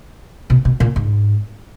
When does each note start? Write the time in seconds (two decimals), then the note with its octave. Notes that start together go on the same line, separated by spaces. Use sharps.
0.50 B2
0.65 B2
0.80 A#2
0.96 G#2